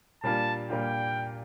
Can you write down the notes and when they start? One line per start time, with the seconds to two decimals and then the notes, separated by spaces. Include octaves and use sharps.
0.23 A#2 G3 A#3 D4 F4 A5
0.69 A#2 G3 A#3 D4 F4 G5